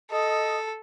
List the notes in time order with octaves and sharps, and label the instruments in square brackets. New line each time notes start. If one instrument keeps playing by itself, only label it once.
[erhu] A4 [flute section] D#5 D#6